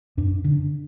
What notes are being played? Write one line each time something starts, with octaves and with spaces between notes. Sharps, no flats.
F#2 D4
D3 D4